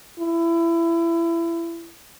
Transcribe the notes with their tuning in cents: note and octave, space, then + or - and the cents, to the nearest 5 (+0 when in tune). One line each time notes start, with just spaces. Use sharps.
E4 +25